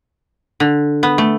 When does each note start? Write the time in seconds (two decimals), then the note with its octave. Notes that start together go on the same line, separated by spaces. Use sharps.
0.60 D3
1.03 B3
1.18 A3